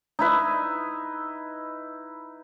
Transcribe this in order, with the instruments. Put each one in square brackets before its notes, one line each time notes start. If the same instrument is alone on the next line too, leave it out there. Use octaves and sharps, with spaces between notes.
[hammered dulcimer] D#4 E4 B4 E5